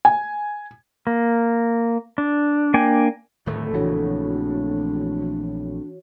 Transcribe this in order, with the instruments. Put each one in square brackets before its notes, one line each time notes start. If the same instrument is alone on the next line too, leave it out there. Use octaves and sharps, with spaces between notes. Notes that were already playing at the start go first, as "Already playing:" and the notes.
[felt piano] G#5
[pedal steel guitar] A#3
D4
A#3 D4 G5 G#5
[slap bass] D1 D#3 A3 [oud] F2 A2
[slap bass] A#1 C#3 [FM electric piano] E3 F#4 C#5 [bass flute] D4